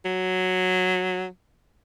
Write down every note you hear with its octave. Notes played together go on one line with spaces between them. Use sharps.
F#3